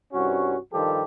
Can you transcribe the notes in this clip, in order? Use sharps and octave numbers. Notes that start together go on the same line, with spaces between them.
C2 G2 C#4 F#4
G2 D#3 F3 G4 A4